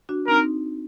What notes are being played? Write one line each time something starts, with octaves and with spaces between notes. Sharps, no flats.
D4 F#4
C4 D#4 A#4